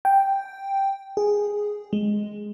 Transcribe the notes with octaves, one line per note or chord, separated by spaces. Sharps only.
G5
G#4
G#3